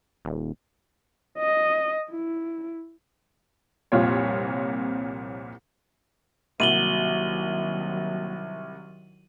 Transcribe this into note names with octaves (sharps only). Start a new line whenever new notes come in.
D#1
D#5
E4
C2 F2 A#2 F4 C#5
C2 D#3 F#3 A#3 F#4 D#7 F#7 G7